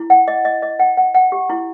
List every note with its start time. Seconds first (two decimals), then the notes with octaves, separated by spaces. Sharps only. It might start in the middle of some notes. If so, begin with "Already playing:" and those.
Already playing: E4
0.10 F#5
0.28 D#5
0.45 D#5
0.62 D#5
0.79 F#5
0.97 F#5
1.14 F#5
1.32 G4
1.50 E4